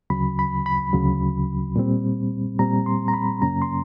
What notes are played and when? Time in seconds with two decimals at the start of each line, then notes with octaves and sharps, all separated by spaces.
0.10 D2 C#3 F#3 B5
0.39 B5
0.66 B5
0.93 D2 C#3 F#3
1.76 A#2 G3 C4
2.59 A#2 G3 C4 A#5
2.86 C6
3.08 A#5
3.14 B5
3.41 F#2 C#3 F#3 A#3 C#4 A#5
3.62 C6